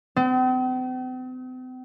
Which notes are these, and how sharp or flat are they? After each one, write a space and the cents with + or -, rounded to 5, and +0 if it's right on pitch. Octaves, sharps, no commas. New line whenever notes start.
C4 -45